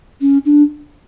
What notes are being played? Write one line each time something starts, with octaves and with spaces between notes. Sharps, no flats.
C#4
D4